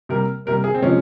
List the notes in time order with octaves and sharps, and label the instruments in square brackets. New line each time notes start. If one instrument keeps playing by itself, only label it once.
[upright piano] C3 G3 A#3 A#4
C3 G3 A#3 A#4
G#4
C4
C3 F3 G#3 C#4